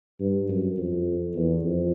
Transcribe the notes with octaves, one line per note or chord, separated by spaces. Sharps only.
G2
F#2
F2
E2
F2